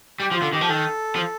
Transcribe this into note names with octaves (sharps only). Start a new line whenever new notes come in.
G3 G4
F3
F4
D3
D#3 G4
F3
D#3 A4
F3